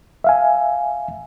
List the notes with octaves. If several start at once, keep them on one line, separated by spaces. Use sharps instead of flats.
E5 F5 G#5